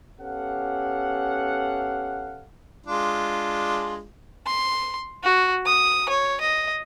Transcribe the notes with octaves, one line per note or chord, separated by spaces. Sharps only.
B3 C#4 G4 A4 F5 F#5
G#3 D4 F4
C6
F#4
D#6
C#5
D#5